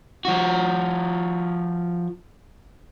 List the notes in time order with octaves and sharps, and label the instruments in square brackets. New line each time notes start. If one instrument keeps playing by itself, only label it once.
[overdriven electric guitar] F3 F#4